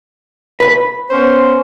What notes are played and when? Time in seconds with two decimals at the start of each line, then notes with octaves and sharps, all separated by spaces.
0.60 B4 B5
1.11 B3 C#4 C5